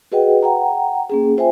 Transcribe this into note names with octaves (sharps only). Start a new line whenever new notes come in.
F#4 G#4 B4 D#5 F#5 G5
F#5 G5 A#5
A#3 C#4 G#4
F4 C5 E5 G5 G#5